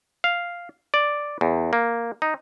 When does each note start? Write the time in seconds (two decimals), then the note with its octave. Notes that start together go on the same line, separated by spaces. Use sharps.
0.24 F5
0.94 D5
1.41 E2
1.73 A#3
2.22 D#4